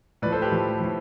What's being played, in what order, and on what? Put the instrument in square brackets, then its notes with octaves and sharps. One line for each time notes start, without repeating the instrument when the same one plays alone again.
[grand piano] A2 F3 B4 D5
A4 C5
G4 B4
A2 F3
A2 F3